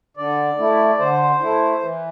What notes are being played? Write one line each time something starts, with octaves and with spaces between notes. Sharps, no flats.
D3 D5
A3 E4
D3 C5
A3 E4
E3